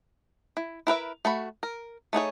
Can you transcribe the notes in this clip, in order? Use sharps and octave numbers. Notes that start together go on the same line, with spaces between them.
E4
E4 A#4 B4 E5
A3 F#4 B5
A#4
A3 D#4 G#4 C#5